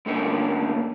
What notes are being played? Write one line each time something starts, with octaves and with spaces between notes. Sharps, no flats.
G2 D3 A3 A#3 C#4